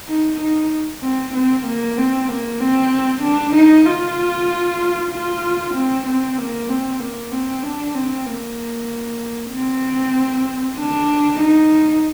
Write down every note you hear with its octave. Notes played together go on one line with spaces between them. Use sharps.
D#4
D#4
C4
C4
A#3
C4
A#3
C4
D4
D#4
F4
F4
C4
C4
A#3
C4
A#3
C4
D4
C4
A#3
C4
D4
D#4